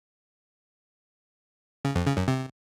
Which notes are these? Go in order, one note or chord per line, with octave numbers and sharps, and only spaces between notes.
C#3
F2
C#3
F#2
C3